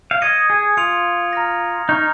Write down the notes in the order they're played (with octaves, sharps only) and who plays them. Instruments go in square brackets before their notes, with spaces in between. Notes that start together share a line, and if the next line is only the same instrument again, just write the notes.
[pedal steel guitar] F5
[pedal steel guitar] D#5 [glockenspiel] D#6 G#6 C#7
[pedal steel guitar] G#4
[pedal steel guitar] F4 [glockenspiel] D#6 C#7 F7
[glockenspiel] A#5 F6 A#6
[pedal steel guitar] D#4 [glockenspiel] A#5 C#6 F6